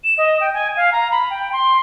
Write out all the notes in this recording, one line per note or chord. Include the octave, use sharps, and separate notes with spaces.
E7
D#5
G5
G#5
F5
A#5
B5
G5
C6